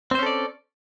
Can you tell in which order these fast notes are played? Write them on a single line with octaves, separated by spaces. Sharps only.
C4 C5 C#4 A4 D5